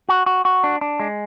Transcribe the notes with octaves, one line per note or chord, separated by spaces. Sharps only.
F#4
F#4
F#4
D4
D4
G#3